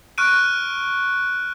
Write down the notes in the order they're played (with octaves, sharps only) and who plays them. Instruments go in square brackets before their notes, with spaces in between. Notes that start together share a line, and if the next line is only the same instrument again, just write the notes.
[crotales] C#6 F6 F#6 D7 D#7